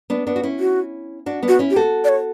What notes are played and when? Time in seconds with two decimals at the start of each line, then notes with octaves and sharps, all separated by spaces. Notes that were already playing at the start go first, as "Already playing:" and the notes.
0.10 B3 D4
0.27 B3 D4
0.36 F#4
0.43 C#4 E4
0.60 F#4
1.26 D4 F#4
1.43 B3 D4
1.48 F#4
1.59 C#4 E4
1.71 G4
1.76 F#4 A4
2.04 D5
2.09 C#5